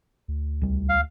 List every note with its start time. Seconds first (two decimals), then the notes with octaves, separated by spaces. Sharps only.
0.28 D2
0.61 C2 G3
0.89 F5